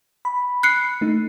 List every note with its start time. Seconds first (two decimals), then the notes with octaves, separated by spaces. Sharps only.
0.25 B5
0.63 F#6 C7 C#7
1.01 A3 D#4